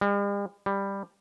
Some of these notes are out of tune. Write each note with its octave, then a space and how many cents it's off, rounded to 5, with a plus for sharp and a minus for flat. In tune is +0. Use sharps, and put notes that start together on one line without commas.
G3 +45
G3 +10